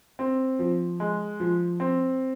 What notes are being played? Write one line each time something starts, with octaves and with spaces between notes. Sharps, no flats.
C4
F3
G#3
F3
C4